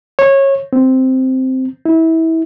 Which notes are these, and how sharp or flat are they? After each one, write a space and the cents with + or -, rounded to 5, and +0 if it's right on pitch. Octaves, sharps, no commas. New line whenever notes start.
C#5 -20
C4 -5
E4 -25